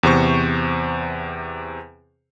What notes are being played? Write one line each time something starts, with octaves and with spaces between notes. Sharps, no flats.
E2 C3 C5 C#6